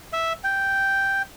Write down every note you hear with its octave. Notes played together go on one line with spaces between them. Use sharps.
E5
G5